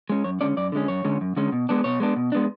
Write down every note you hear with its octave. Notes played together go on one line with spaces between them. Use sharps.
G#3 C#4
F#2 C#5
D3 G#3 C#4 D5
F#2 D5
D3 G#3 C#4
F#2 C#5
D3 G#3 C#4
F#2
D3 G#3 C#4
B2
G#3 B3 D4
B2 C#5
G#3 B3 D4
B2
G#3 B3 D4